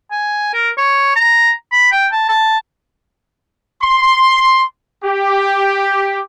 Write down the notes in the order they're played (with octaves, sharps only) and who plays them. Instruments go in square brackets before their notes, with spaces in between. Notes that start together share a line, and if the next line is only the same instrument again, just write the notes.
[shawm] G#5
A#4
C#5
A#5
B5
G5
A5
A5
[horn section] C6
G4